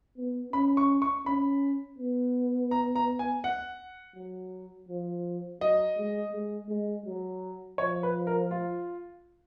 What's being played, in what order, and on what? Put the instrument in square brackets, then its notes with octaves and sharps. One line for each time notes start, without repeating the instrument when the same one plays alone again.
[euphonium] B3
[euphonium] C#4 [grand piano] B5
[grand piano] C#6
C#6
[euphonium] C#4 [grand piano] B5
[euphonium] B3
[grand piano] A#5
A#5
G#5
F#5
[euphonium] F#3
F3
[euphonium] F#3 [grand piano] D#5
[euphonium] G#3
G#3
G#3
F#3
[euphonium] F3 [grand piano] C#5
[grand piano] B4
A#4
F4